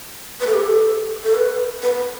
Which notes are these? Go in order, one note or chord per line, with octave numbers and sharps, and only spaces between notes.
B4
A4
G4
A4
A4
B4
B4